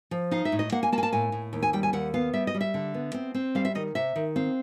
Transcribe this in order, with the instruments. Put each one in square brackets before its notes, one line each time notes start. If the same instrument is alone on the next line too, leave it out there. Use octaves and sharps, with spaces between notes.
[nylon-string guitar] F3
D#4 F5
E5
A2
D#5
A#3 F#5
G#5
A#3 A5
G#5
A5
A2 G#5
A2
D#2
G#5
G3 G5
G#5
D#2 F#5
B3 F5
G3 E5
D#5
G3
E5
D3
B3
C4
C4
G3 F5
E5
D#3 D#5
C3 E5
D#3
C4 F5